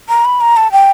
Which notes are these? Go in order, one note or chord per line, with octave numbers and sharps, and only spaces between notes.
A#5
B5
A#5
A5
G5